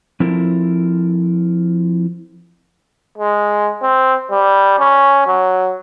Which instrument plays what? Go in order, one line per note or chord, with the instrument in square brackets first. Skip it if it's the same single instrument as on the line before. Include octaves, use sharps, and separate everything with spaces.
[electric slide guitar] F3 C4 E4 A4 A#4
[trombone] G#3
C4
G3
C#4
F#3